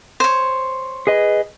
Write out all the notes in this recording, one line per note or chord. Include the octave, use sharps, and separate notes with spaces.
C5 C#5
G#4 B4 D#5